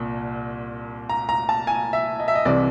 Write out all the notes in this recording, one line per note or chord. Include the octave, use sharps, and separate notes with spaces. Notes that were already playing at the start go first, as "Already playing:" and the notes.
Already playing: C2 A#2
A#5
A#5
A5
G#5
E5
D#5
E5
D#5
C2 C3 E3 D5